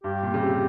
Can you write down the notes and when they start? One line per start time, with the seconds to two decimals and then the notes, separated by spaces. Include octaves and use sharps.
0.04 G2 G4
0.23 A#2
0.34 C#3
0.41 C3